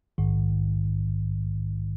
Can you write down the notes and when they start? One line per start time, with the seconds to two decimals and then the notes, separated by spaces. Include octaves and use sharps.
0.18 A#1 G#2 D#3